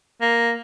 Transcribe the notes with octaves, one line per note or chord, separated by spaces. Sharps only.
A#3